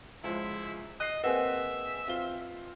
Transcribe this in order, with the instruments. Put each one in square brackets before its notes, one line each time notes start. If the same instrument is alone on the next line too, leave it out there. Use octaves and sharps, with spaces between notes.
[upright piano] C#2 F3 G#3 [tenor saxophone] E4
[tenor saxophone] D#5 [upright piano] F#6 C7
[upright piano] A#3 C4 G#4 [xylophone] B4 D#5 F#5 [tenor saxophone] E5
[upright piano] C4 F4 G7